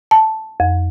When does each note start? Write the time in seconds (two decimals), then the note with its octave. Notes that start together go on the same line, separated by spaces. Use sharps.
0.11 A5
0.60 F2